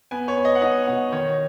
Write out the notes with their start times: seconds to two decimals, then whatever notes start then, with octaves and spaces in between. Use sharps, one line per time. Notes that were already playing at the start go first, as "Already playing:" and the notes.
0.11 B3 G#5
0.28 C#5
0.37 B3
0.45 D#5
0.55 F#5
0.61 D#4 D#5
0.87 B2 F#5
1.12 D#3 C#5